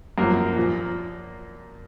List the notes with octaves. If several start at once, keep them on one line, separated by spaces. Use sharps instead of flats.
F#2 F3 A#3
A#2 F3